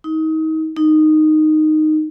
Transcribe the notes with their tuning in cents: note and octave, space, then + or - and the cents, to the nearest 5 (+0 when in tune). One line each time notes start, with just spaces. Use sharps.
D#4 +30
D#4 -10